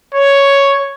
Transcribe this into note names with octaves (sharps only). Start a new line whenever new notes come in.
C#5